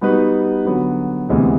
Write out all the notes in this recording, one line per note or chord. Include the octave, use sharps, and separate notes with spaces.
G3 B3 D#4 F#4 B4
D3 F#3 B3
D2 C3 E3 G#3 B3